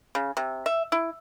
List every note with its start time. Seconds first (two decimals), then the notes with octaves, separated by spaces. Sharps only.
0.15 C#3
0.37 C3
0.66 E5
0.92 E4